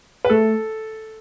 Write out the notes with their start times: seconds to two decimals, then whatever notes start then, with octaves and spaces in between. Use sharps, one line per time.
0.25 B4
0.30 A3 A4